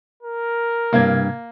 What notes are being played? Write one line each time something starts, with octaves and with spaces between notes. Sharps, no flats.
A#4
G2 C3 A#3 D4 G#6